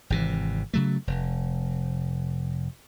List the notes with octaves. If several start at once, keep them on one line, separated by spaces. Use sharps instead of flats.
G#1 C3 E3
C#3 F#3 A3
F1